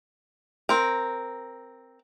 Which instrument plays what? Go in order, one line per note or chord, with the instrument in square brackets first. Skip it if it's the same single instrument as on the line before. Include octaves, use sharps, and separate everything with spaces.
[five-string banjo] C4 A#4